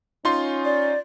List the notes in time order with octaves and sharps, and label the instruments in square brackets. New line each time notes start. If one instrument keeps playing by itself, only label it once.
[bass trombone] C#4 [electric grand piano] D#4 F4 C6
[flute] D5